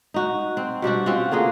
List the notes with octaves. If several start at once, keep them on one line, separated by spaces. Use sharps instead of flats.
D#4 F#4
C4
B2 G3 D4 F#4
C4 C#4 F4 F#4
D3 A#3 F4 G#4